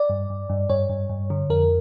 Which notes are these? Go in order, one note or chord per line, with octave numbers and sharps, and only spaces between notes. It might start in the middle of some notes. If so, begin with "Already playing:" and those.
Already playing: D5
G2
G2
G2
G2 C#5
G2
G2
D3
F2 A#4